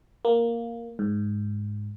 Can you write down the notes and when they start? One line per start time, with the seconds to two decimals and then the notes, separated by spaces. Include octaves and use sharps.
0.25 A#3
0.99 G#2